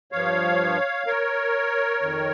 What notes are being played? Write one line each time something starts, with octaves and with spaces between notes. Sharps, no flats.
G2 F3 C#5 F5
A#4 C#5
F2 D#3